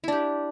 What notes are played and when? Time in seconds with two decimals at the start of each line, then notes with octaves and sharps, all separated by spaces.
0.04 E4
0.08 D4
0.12 G4